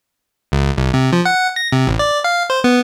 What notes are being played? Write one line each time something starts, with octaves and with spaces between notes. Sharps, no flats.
C#2
C2
C3
F3
F#5
A#6
C3
A1
D5
F5
C5
B3